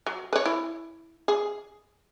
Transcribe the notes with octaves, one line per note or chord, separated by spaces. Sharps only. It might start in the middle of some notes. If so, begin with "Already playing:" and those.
F#3
B4 C#5
E4
G#4